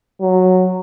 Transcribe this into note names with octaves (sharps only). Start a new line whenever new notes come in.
F#3